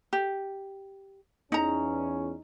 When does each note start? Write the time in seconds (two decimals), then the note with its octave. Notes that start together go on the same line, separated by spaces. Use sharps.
0.13 G4
1.52 E2 C#4 D#4 A#5